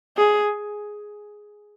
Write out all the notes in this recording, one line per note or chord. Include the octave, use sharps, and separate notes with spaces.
G#4